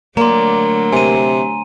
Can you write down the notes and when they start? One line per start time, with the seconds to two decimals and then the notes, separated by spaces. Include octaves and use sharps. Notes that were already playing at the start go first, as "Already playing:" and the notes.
0.17 D3 F#3 A3 A#3 D5 A#5 C6
0.93 C3 G#5 D#7